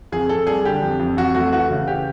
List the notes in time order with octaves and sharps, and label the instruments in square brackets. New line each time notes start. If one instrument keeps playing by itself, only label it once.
[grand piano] F2 G#4
F2 A4
G3 G#4
D3 G4
F2
F2
F2 F#4
A3 F#4
E3 F#4
C#3
G4